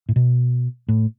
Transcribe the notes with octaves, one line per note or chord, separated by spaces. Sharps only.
A2
B2
A2